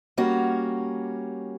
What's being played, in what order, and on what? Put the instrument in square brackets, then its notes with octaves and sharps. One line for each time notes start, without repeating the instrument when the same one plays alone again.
[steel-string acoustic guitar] G3 A#3 C#4 F#4